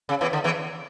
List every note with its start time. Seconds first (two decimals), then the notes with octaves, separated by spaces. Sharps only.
0.09 C#3
0.21 E2 E3
0.33 D3
0.44 E2 E3